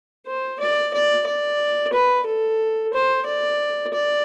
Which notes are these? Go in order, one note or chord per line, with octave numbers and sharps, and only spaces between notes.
C5
D5
D5
D5
B4
A4
C5
D5
D5